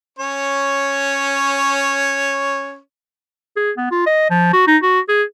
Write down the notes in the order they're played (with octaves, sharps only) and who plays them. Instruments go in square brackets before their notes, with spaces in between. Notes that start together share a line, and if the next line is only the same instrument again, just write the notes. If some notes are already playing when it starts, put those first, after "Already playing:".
[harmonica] C#4 C#5
[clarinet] G#4
B3
F4
D#5
F3
F#4
D#4
F#4
G#4